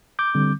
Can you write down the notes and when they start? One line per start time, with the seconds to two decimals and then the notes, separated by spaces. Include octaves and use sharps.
0.19 D6 G6
0.35 D3 G3 C4